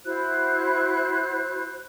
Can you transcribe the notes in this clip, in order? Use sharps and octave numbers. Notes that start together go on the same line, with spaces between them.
E4 F#4 C5 F#6